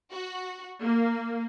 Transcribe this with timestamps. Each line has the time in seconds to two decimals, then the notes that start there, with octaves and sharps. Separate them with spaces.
0.12 F#4
0.81 A#3